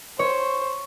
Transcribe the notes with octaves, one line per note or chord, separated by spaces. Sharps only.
C5 C#5